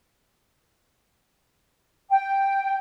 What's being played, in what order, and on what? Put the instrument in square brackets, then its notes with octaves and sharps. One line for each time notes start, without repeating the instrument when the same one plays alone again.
[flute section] G5